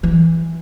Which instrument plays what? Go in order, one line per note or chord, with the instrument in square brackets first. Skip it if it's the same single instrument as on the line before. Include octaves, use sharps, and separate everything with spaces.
[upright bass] E3